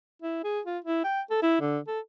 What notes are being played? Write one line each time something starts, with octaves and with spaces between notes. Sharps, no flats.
E4
G#4
F4
E4
G5
A4
E4
D3
A4